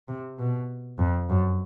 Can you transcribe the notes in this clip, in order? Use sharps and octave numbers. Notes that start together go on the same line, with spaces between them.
C3
B2
F2
F#2